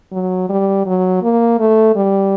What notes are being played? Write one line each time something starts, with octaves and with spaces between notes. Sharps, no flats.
F#3
G3
F#3
A#3
A3
G3